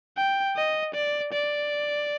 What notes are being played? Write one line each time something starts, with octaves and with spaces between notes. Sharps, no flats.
G5
D#5
D5
D5